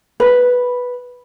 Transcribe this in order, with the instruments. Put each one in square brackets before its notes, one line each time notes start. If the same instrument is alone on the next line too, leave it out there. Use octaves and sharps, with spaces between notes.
[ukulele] B4